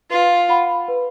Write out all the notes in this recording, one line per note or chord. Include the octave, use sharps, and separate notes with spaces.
F4 B4
F#5 B5
B4